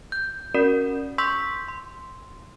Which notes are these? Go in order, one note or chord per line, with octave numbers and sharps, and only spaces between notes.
G6
C#4 F#4 A#4 D5
C6 C#6 E6 G6 B6
C6